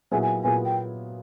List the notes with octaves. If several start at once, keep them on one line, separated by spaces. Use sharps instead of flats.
A#2 F#3 B3 E4 G#4 G#5
G#5
A#2 F#3 B3 E4 G#4 G#5
G5